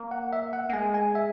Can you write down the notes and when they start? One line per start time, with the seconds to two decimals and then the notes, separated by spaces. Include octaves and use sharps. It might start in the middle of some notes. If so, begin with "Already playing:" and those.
Already playing: A#3
0.11 F#5
0.33 E5
0.53 F#5
0.69 A#3
0.73 G#3 G#5
0.94 G#5
1.15 E5